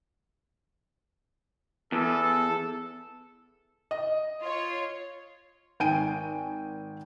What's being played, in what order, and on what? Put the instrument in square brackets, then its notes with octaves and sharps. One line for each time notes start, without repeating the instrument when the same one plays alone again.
[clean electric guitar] E2 [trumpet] A4
[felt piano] D#5
[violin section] F4 C#5
[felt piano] G#1 G5 G#5 D7 D#7